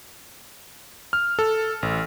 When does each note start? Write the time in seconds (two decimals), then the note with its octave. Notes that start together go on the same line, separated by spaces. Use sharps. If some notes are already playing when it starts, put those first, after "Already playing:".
1.13 F6
1.39 A4
1.83 A1